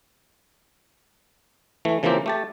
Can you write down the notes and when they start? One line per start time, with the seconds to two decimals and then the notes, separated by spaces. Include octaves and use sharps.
1.85 E3 A3
2.03 C#3 E3 F3 A#3 C4 G4
2.26 A3 G4 A5